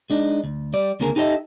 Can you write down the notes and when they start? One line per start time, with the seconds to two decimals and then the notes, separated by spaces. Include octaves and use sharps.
0.10 G#3 D4 D#4
0.44 D2
0.74 G3 D5
1.00 C#2 D3 A#3 C#4 G#4 A#4
1.16 D#4 G4 A4 A#4 D#5 E5